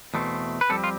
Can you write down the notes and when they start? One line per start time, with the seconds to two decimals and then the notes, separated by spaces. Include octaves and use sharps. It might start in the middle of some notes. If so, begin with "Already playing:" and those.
0.14 E2 B2 A3 C4
0.61 B4
0.69 F2 C3 G3 C4 A4
0.84 F4